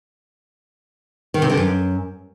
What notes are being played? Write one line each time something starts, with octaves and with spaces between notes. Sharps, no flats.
D#3
C3
D3
F#2